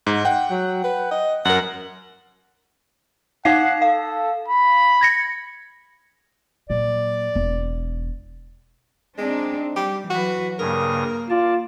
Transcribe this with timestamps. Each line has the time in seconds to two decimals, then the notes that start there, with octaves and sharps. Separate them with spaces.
0.07 G#2
0.25 F#5 G5
0.51 F#3
0.84 B4
1.11 D#5
1.45 F#2 A#4 F#5
3.45 D#4 F5 F#5 C7
3.82 A4 F5
4.48 B5
5.01 G#6 A#6 C#7
6.70 A#2 F#3 D5
7.35 E1
9.18 G#3 C4 D4 D#4
9.76 G3 G4
10.10 E3 F#3 F#4 B4
10.59 G2 C#3 A#3 A#4 D#6
11.30 F4 D5 A5